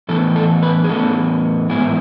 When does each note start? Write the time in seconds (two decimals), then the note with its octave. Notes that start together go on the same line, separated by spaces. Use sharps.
0.09 A2 E3 B3 A4
0.36 A4
0.63 B4
0.84 G#4
0.89 A2 E3 B3 A4
1.69 G#2 E3 B3 E4 G#4